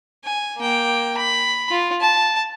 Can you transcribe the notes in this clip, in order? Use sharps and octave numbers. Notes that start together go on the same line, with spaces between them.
G#5
A#3 G5
B5
F4
A5